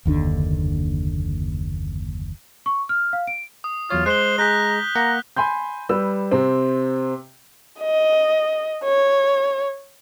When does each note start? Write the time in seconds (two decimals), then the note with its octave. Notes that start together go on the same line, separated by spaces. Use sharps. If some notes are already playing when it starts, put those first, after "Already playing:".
0.05 F#1 D#2 D3 D4
2.66 C#6
2.89 F6
3.13 F5
3.27 D7
3.64 D#6
3.90 E2 F#3 F4 C#5
4.06 G#3 C5 F#6 G7
4.38 G#3 G#4 A#5 F#6 G6 B6
4.96 A#3 F#5 A#5
5.37 G#5 B5 C6 G6
5.89 G3 B4 E6
6.31 C3 C4
7.80 D#5
8.84 C#5